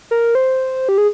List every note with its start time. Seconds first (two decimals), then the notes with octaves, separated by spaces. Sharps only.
0.11 A#4
0.35 C5
0.89 G4
0.98 G#4